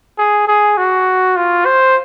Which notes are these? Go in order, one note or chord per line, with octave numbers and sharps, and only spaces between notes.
G#4
G#4
F#4
F4
C5